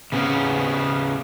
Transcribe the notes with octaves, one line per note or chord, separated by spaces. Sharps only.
C#3 B3 C#4